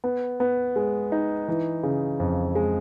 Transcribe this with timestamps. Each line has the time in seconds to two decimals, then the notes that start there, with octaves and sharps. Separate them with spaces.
0.04 B3
0.40 B3
0.76 G#3
1.12 D#4
1.48 E3
1.83 C#3
2.20 F2
2.55 G#3